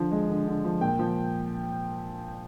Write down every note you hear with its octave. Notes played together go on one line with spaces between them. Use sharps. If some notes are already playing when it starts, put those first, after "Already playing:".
Already playing: D3 F3
G#3
D3
D3
F3
A#2 G5
F3